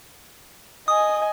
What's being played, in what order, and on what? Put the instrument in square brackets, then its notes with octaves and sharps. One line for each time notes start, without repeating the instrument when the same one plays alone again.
[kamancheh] D#5 G#5 [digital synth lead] D#6